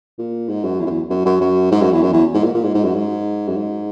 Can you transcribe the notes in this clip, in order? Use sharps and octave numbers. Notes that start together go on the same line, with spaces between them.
A#2
G#2
F#2
E2
F#2
E2
F#2
F#2
F#2
G#2
F#2
E2
F#2
E2
G#2
A#2
A#2
G#2
G#2
F#2
G#2
F#2
G#2